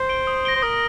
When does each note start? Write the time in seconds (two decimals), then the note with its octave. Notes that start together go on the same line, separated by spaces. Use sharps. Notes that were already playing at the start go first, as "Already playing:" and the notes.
Already playing: C5
0.09 D7 G7
0.27 D#6
0.45 A#6 D7 G7
0.56 C5
0.62 A#4 D#6